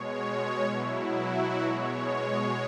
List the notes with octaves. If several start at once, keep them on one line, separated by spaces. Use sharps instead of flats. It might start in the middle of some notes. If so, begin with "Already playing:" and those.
Already playing: B2 G#3 C#5
C#5
B2 F#3 E4
F#4
B2 G#3 C#5